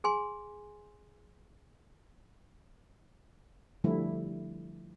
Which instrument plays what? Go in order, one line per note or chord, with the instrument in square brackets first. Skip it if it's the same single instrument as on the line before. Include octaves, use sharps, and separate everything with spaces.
[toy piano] G#4 G#5 C6
[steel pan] D3 F3 G3 A3 E4